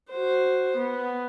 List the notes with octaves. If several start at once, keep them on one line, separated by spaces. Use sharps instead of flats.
F#4 C5
B3